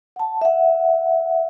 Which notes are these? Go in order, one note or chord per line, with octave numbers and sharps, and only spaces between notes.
F#5 A5
E5 F#5